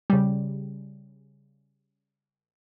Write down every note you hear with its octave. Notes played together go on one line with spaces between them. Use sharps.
C#3 G3